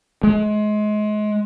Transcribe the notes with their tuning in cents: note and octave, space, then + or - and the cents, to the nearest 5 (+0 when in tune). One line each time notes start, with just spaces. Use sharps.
G#3 +30